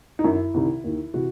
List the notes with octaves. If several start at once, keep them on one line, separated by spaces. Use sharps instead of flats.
D#4
F#2 D#3 E4
C2 C3 D#3
D#2 D#3
C3 E3 F#4